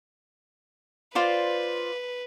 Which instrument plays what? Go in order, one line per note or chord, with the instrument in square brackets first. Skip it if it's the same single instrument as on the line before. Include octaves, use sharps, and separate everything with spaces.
[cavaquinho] F4 C5 D5 [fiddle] B4